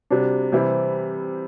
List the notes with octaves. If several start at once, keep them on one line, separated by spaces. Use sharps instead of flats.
C3 G3 D4 F#4
C3 E3 G3 C4 E4